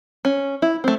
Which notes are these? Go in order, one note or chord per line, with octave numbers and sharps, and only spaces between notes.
C#4
E4
A3 C4